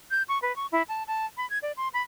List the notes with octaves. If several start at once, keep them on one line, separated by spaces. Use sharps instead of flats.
G6
C#6
B4
C#6
E4
A5
A5
B5
G#6
D5
C6
B5